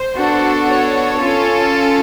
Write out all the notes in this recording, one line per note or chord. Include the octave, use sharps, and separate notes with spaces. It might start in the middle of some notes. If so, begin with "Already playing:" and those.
Already playing: C5
B3 D4 F#4 A4
C#5
C#4 F4 A4